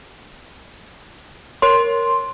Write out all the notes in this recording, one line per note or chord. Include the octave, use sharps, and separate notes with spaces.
A#4 C#5 C6